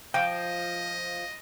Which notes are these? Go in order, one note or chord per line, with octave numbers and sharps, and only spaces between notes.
F3 D#5 G5